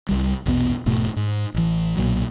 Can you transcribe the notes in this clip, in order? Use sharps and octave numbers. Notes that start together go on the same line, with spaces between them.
C2 G3
A#1 E2 B2 B3
E1 G#2 B2 A3
G#2
A1 E3
B1 A#2 F#3